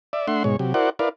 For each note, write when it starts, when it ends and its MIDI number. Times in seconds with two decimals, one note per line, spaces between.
0.13 0.27 74
0.13 0.27 76
0.28 0.43 57
0.28 0.43 62
0.28 0.43 76
0.28 0.43 78
0.28 0.43 84
0.44 0.56 44
0.44 0.56 47
0.44 0.56 56
0.44 0.56 73
0.59 0.73 48
0.59 0.73 54
0.59 0.73 67
0.74 0.90 64
0.74 0.90 66
0.74 0.90 70
0.74 0.90 72
0.74 0.90 74
0.74 0.90 78
0.99 1.09 64
0.99 1.09 70
0.99 1.09 71
0.99 1.09 74
0.99 1.09 77